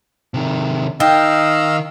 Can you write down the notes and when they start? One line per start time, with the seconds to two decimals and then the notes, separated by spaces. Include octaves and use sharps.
0.34 C3 D#3
1.00 D#3 D#4 D#5 F5 G5 E6